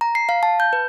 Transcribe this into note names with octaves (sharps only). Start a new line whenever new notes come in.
A#5
C7
F5
A5
G6
B4